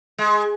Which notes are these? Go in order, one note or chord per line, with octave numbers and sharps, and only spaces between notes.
G#3